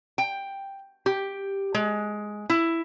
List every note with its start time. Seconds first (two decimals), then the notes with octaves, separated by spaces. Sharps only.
0.18 G5
1.06 G4
1.74 G#3
2.50 E4